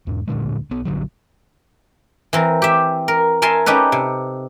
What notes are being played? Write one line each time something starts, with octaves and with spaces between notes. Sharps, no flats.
E2 G#2
D1 A#2 D3 G#3
B1 B3
A#1 D3 F#3
E3 C4 A#4
G4 E5
A#4
A#4 E5 G#5 A5 C6
C#4 D#4 G4 A4 B4
C3